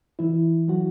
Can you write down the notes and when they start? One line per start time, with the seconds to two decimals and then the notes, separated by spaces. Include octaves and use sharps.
0.19 E3 E4
0.68 F#3 F#4